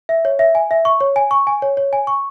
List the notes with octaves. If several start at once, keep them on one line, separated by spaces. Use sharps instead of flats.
E5
C#5
E5
G#5
E5
C#6
C#5
G#5
C#6
G#5
C#5
C#5
G#5
C#6